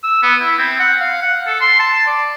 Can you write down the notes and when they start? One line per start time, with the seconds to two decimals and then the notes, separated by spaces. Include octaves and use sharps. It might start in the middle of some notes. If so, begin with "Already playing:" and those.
0.03 E6
0.23 B3
0.40 E4
0.58 C4
0.79 F#5
1.01 F5
1.22 F#5
1.47 A4
1.60 C6
1.79 A5
2.07 D5